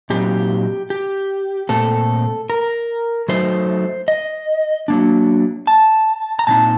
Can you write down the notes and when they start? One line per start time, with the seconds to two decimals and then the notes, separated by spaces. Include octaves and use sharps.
0.10 A#2 F#3 C4 D#4 G4
0.90 G4
1.69 A#2 A3 C4 A4
2.50 A#4
3.28 F#3 A3 D#4 C5
4.08 D#5
4.88 F#3 A#3 D4
5.67 A5
6.39 A#5
6.47 A#2 G3 C4 D#4 A5